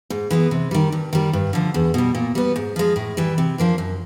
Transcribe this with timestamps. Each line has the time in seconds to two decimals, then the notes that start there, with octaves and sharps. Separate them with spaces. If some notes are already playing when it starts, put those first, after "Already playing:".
0.10 G#2
0.31 E3 G#3 B3
0.51 C3
0.71 D#3 G3
0.92 G2
1.13 D#3 G3
1.33 G2
1.53 D3 F3
1.74 E2
1.94 B2 G3
2.15 A#2
2.35 G3 B3
2.56 G#2
2.76 F3 G#3
2.96 A2
3.17 E3 G3
3.38 C3
3.58 F3 A#3 D4
3.78 F#2